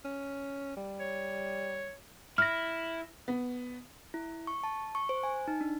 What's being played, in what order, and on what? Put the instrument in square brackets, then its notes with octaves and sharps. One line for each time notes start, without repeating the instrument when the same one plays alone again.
[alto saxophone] C#4
G3
[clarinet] C#5
[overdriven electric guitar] E4 [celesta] F6 A#6
[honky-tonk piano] B3
[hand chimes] E4
C#6
A5
C#6
C5
G#5
D#4
D4